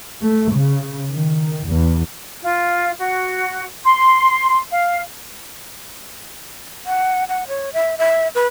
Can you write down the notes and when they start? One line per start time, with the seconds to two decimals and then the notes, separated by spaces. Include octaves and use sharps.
0.22 A3
0.54 C#3
1.10 D#3
1.66 E2
2.42 F4
2.99 F#4
3.85 C6
4.71 F5
6.86 F#5
7.29 F#5
7.48 C#5
7.73 E5
7.98 E5
8.35 B4